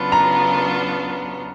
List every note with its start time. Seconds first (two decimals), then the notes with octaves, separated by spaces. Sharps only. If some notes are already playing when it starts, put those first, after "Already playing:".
Already playing: C#3 F#3 B3 D4 F4 B5
0.12 A#5